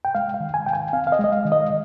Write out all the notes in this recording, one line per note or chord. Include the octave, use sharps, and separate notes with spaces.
G5
G#3 F5
F5
D#3
G#5
D#3 G5
G#5
C4 F5
F5
D#5
G#3
D#5
F5
D#3
D#5